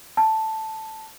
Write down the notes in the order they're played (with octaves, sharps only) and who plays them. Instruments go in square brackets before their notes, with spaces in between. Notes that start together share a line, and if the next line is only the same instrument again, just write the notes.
[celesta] A5